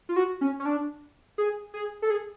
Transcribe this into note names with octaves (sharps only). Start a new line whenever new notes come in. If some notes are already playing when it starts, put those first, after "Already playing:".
F4
F#4
C#4
C#4
D4
G#4
G#4
A4
G#4